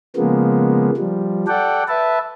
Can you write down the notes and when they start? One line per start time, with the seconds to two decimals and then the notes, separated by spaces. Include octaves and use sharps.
0.16 C#3 F3 G#3 A#3 B3
0.97 F3 G3
1.47 A4 D5 F#5 G5
1.89 B4 E5 A5